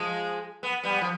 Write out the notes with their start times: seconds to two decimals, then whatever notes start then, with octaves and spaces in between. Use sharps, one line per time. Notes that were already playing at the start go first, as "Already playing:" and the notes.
Already playing: F3 G#3
0.63 B3
0.84 G3 B3
1.01 F3